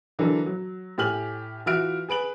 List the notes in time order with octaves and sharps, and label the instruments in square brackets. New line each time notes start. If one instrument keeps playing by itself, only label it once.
[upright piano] D3 E3 F#3 D4 A4 A#4
F#3
A2 G4 G#5 F6 F#7
E3 F4 F#4 E5 F6 D7
G#4 B4 D7 F#7